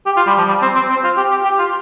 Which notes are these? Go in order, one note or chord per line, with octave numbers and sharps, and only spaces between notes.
G4
F4
G3
F3
G3
C4
C4
C4
F4
G4
G4
G4
F4